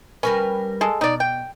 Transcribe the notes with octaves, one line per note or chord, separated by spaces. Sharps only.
G3 C#4 A#4 B4
G#3 A4
B2 D#4 D5
G5